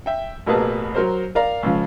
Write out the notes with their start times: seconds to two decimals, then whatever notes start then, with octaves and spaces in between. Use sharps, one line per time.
0.06 E5 G5
0.46 A1 B2 A#3 G#4 B4 A5
0.95 F#3 A#4 C5
1.35 A#4 D5 F5 A#5
1.63 C#2 C#3 F3